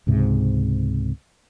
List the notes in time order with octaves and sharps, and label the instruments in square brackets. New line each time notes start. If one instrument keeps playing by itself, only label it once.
[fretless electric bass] C#2 G#2 C3